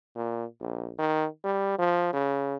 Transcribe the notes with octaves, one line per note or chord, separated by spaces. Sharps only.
A#2
A#1
D#3
G3
F3
C#3